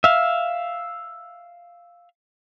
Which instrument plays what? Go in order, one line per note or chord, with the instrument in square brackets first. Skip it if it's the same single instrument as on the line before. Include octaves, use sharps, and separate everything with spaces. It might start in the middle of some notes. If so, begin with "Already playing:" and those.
[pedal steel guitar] E5 F5